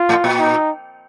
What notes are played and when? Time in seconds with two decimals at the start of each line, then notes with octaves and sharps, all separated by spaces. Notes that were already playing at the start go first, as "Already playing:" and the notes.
Already playing: F4
0.09 A2
0.24 A#2
0.39 D#4